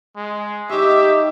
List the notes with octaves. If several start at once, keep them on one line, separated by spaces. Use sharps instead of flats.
G#3
D#4 G4 E5 C#6